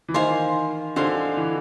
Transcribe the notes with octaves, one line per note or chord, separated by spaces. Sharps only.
E3
D#3 C5 F5 G#5 C6
D3 C5 F5 G#5 C6
E3